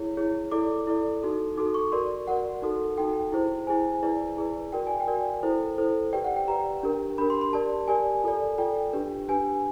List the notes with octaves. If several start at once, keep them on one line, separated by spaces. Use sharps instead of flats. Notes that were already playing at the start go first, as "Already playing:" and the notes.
Already playing: E4 G#4 C#5
E4 G#4 C#5
E4 A4 D5 D6
E4 A4 D5
D#4 F#4 A4
D#4 F#4 A4 D6
C#6
F#4 A#4 D5 C6
F#4 A#4 D5 F#5
D#4 F#4 A4
D#4 F#4 A4 G5
E4 G#4 C5
E4 G#4 C5 G#5
E4 G#4 B4 D5
E4 G#4 B4 D5
F#4 A#4 D5 G5
G#5
G5
F#4 A#4 D5
E4 A4 C5
E4 A4 C5
G4 B4 D5 G5
F#5
G5
G4 B4 D5 A#5
D4 G4 A#4
D4 G4 A#4 B5
C6
C6
G4 A#4 D5 A5
G4 A#4 D5 G#5
F4 A4 D5
F4 A4 D5 G5
D4 G4 B4
D4 G4 B4 G#5